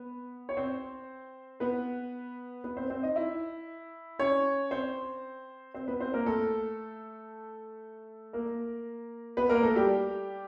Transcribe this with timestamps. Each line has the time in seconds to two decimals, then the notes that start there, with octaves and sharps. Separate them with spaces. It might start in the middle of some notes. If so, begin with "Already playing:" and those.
Already playing: B3 B4
0.49 C#5
0.57 C4 C5
1.60 B3 B4
2.64 B3 B4
2.77 C4 C5
2.90 C4 C5
3.03 D#4 D#5
3.16 E4 E5
4.19 C#4 C#5
4.71 C4 C5
5.74 C4 C5
5.88 B3 B4
6.00 C4 C5
6.14 A#3 A#4
6.26 A3 A4
8.33 A#3 A#4
9.37 B3 B4
9.49 A#3 A#4
9.63 A3 A4
9.76 G3 G4